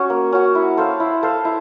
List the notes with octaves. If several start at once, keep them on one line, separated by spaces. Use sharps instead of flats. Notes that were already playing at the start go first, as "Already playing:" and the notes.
Already playing: C#4 F#4
A#3
C#4 F#4
E4
A4 C5 F5
E4
A4 C5 F5
E4